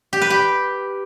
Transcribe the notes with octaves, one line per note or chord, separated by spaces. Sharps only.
G4
B4
G4